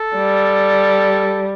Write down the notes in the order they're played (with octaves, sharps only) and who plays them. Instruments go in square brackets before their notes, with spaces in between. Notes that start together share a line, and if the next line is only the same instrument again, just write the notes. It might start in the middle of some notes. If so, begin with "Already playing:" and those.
Already playing: [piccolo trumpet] A4
[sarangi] G3